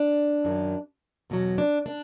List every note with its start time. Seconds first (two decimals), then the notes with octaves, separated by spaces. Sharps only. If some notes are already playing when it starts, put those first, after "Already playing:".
Already playing: D4
0.45 F#2 D#3 F#3
1.30 E2 B2 F#3
1.58 D4
1.86 D4